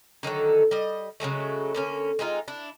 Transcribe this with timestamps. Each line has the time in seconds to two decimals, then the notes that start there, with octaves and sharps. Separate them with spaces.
0.23 D3 D#3 F#3 A4
0.71 G3 D#5
1.20 C#3 F#3 G#3 A3
1.75 D3 A#3 C#4
2.19 G#3 C4 D#4 F4
2.48 D4 E4